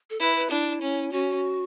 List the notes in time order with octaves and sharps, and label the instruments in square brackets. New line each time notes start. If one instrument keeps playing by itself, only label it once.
[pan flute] A4
[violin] E4 [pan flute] B4
[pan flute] B4
[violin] D4 [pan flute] E4
[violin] C#4
[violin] C#4 [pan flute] F#4